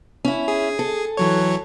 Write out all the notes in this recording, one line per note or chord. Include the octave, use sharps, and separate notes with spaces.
C#4 E4
G#4
A4
E3 F#3 C#5